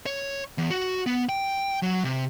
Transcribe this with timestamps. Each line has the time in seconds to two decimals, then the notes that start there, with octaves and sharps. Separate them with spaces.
0.06 C#5
0.58 E2
0.70 F#4
1.07 B3
1.29 G5
1.83 F#3
2.04 C3